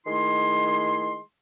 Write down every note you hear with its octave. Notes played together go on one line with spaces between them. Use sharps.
D#3 G#3 A3 E4 C6